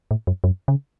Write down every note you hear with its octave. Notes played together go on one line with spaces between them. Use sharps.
A2
F#2
F#2
C#3